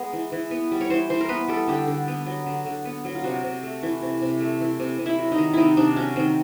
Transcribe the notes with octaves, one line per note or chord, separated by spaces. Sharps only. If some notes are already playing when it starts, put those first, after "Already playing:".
Already playing: G#3 B3 A#4
E3
E3
B3
G3
C#5
E3 C5
E3 C5
A#4
B3 B4
G3 A4
D3 G4
D3
B3
F#3
D3
D3
B3
F#3
F4
C3 F#4
C3
A3
E3
C3
C3
A3
E3
C3
C3
E4
F#3
D#4
D#3
C3 D#4 E4
C3 D4
F#3 C#4
D#3 C4